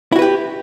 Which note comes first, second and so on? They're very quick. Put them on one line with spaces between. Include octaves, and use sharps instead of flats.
E4 F#4 B4 G4